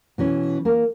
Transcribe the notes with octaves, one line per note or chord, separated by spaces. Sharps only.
B2 E3 C#4
A#3 A#4